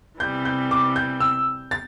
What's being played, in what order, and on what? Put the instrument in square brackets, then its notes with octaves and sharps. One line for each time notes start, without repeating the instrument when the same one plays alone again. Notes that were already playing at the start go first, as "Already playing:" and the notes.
[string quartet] C3 E3 G3 [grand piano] G6
[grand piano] G6
D6
G6
E6
A6